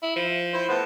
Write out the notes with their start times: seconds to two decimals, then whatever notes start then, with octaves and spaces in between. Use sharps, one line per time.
0.03 E4
0.16 F3
0.52 E4 C5
0.69 A2 B3 C5